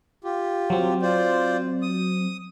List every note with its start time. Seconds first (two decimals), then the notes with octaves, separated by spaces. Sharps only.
0.24 F4 G4
0.70 F#3 C4
1.02 F4 C5 D5
1.82 D#6